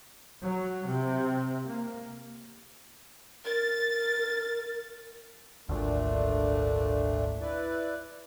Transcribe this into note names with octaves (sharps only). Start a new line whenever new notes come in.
F#3
C3
A#3
A#4 A6
G#1 D2 A#2 A3 D4
E4 B4 D5